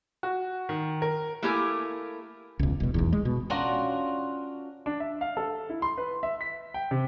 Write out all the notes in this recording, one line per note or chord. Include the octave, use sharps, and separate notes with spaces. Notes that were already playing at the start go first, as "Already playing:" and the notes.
F#4
D#3
A#4
A3 A#3 E4 G4 A#4 G#5
E1 C#2
E1 B2
F1 B1 E2
G#3
B2
C#4 D4 F4 F#4 A#4
D4
E5
F5
A4
E4
C6
B4
E5
B6
G5
C3